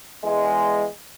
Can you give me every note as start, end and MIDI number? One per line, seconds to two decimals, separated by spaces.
0.24 0.86 40
0.24 0.86 56